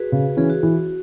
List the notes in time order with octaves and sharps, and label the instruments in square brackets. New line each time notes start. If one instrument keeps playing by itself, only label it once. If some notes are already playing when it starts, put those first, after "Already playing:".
Already playing: [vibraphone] F#4 G#4 B4
[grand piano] C#3
[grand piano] E3 C#4 [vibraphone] G#4
[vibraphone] F#4
[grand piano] E3